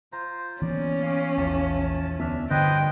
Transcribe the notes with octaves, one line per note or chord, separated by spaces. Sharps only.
F4 C5 A#5
E3 A#3 B3 C#4 D5
F5 G#5 C#6 D6
A#1 E2 F4 A5 D6
D2 B3 D4 E5 A5 F6
G2 D3 B4 C5 D#5 G5 G#6